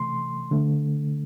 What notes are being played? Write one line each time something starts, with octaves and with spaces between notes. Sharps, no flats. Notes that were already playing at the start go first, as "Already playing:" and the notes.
Already playing: C3 E3 A3 C6
D3 A3